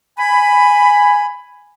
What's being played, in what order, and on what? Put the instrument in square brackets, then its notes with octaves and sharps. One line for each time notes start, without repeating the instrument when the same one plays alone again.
[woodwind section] G#5 B5